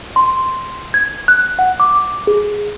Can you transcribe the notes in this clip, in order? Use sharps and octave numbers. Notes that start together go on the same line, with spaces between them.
C6
G#6
F#6
F#5
D6
G#4